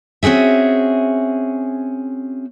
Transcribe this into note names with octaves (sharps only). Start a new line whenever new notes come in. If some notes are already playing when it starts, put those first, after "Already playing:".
C4 C#4 F#4 G#4 E5